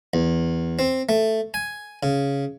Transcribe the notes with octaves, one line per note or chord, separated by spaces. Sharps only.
E2
C4
A3
G#5
C#3